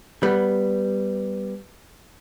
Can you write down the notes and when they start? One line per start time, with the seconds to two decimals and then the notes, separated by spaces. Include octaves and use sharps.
0.23 G3 B3